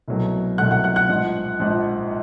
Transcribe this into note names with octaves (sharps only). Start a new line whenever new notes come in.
C2 B2 F#3 A3
C2 B2 F#3 A3 F#5 F#6
F#5 F#6
F#5 F#6
F#5 F#6
A#1 G#2 F3
A#1 G#2 F3